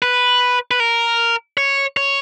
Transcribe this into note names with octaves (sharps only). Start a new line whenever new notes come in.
B4
B4
A#4
C#5
C#5